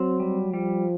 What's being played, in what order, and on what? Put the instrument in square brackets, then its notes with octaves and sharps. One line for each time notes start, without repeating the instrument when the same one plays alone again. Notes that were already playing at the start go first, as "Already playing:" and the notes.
Already playing: [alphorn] F#3 [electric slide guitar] C4
[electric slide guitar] G3
[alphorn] F3 [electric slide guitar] G3